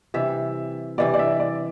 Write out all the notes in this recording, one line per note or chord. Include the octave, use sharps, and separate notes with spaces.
C3 E3 G3 E5
C3 E3 G3 D5
D5
E5
D5